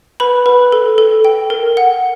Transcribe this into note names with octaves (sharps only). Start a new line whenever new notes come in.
B4 B5
B4
A4
A4
G5
A#4
F#5